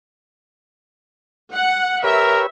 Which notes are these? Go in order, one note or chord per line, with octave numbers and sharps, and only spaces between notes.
F#5
G4 A#4 B4 C#5 E5